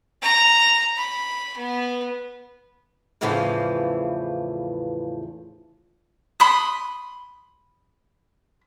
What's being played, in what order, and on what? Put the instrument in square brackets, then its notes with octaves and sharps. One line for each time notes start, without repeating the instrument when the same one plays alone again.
[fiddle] A#5
B5
B3
[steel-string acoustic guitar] E2 A2 C#3 E3 F3
[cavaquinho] B5 C6 D#6